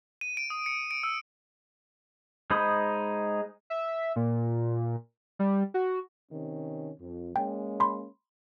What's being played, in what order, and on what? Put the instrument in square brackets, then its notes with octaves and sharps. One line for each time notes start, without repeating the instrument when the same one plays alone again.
[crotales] D#7
D7
D#6
C#7
D7
E6
[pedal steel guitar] G#3 D#4 C5 B5 D#6
[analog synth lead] E5
A#2
G3
F#4
[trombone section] C3 D#3 C#4
F2
[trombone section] G#3 A#3 C#4 [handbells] G5
[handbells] B5 C6